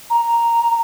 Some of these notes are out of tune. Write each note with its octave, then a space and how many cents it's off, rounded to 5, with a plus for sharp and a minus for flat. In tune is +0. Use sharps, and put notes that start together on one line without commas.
A#5 +0